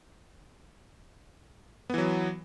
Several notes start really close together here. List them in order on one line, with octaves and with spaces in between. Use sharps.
B3 E3 F#3